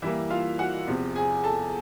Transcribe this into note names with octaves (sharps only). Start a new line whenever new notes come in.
E3 G3 A#3 E4 E5
F4 F5
F#4 F#5
E2 C3 F3
G#4 G#5
A4 A5